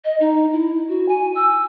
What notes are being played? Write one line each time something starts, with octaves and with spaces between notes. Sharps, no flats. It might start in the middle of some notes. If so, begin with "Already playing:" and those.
D#5
D#4
E4
F#4
G#5
E6